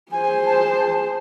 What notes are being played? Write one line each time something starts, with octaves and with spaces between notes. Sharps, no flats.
G#4 C5 G#5
A5